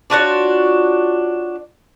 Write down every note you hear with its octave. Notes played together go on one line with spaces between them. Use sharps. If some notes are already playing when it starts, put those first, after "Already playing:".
D4 F4 F#4 C#5